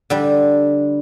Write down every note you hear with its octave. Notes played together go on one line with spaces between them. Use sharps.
D3 G3